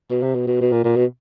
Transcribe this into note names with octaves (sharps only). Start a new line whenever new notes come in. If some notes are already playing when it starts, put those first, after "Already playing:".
B2
C3
B2
B2
B2
A#2
A#2
B2